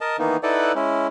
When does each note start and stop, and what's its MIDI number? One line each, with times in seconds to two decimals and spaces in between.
0.01 0.17 70
0.01 0.17 75
0.01 0.17 81
0.19 0.37 51
0.19 0.37 52
0.19 0.37 58
0.19 0.37 59
0.19 0.37 63
0.43 0.72 63
0.43 0.72 64
0.43 0.72 69
0.43 0.72 71
0.43 0.72 74
0.43 0.72 78
0.75 1.07 56
0.75 1.07 61
0.75 1.07 64